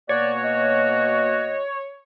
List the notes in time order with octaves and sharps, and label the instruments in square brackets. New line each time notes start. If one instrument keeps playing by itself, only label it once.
[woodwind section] B2 A#3 F#4 [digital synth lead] C#5 [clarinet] D5
[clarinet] D#5